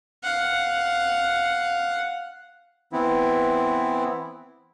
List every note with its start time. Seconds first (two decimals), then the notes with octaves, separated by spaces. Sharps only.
0.23 F5 F#5
2.93 E3 B3 C4 E4